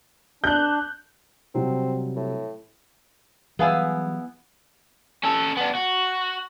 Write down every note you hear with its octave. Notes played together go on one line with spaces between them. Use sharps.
D4 F#6 G6
C3 F#3 G3 C4
A2
E3 F#3 G3 B3 E4 G#4 F5 G#5
C#4 A4
B3 D4
F#4